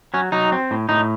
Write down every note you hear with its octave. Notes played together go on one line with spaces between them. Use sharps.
F#3 C#4
F#3 D#4
C4
A2
A2 D#4